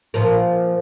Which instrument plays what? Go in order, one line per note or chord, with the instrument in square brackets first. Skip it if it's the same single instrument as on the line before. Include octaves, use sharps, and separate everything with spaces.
[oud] A#2 F3 A#4